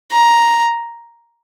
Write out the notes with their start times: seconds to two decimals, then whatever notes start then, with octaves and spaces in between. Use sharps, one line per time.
0.12 A#5